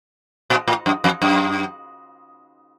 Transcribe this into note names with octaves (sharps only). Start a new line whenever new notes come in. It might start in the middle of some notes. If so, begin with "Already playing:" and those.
A#2
A2
F#2
F2
F#2